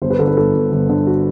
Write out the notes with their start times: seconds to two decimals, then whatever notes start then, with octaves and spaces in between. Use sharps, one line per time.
0.02 G1 C5
0.10 B4
0.19 D3 A4
0.28 B4
0.36 G1 A4
0.54 G1
0.72 G1
0.89 D3
1.07 F#4